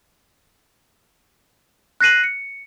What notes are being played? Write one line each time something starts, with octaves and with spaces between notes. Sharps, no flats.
F#6 A#6 C7 D#7 F#7
C#7